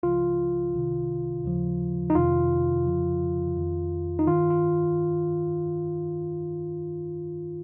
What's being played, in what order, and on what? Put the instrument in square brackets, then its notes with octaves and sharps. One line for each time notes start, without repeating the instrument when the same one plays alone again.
[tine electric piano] C#2 C#3 F3 F4
C2 C3 D#3
D#2 C#3 F3
D#4
F2 C3 D#3 F4
F2 C#3 F3
F2 D#3
D#4
G2 D#3 F4
F4